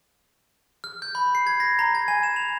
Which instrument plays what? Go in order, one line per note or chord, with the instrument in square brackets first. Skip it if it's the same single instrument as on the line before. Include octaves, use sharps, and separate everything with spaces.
[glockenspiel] F6
G6
B5
C7
G#6
A#6
A#5
G#6
G#5
E7
F7